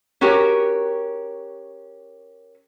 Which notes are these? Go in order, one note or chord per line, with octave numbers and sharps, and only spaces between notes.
C#4 F#4 G4 A#4